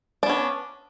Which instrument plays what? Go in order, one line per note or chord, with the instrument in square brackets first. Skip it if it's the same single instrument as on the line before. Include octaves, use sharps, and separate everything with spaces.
[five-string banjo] D4
B3
C#4